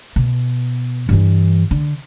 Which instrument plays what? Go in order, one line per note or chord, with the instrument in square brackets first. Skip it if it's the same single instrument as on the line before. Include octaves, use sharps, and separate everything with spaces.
[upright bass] B2
G2 E3
D3